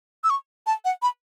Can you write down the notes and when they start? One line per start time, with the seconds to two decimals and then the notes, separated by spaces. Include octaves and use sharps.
0.24 E6
0.30 C#6
0.67 A5
0.85 F#5
1.02 B5